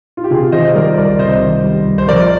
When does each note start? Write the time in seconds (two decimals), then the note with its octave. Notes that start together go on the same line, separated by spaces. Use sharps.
0.17 F4
0.24 G4
0.30 C3 F4 G#4
0.52 D#3 C5 D#5
0.75 G3 A#4 D5
0.97 C2 A#4 D5
1.19 C3 C5 D#5
1.42 D#3
1.64 G3
1.86 C2
1.98 C5
2.08 F3 A#4 D5